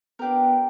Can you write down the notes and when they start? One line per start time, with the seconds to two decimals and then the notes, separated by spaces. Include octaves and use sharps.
0.19 B3 D4 G4 A#4